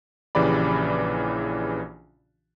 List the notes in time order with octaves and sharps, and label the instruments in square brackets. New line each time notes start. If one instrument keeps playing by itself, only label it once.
[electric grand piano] A#1 C#3 E3 G4 D5 B5